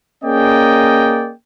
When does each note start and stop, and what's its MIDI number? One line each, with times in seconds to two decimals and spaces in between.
0.24 1.32 58
0.24 1.32 61
0.24 1.32 68
0.24 1.32 74
0.24 1.32 75
0.24 1.32 79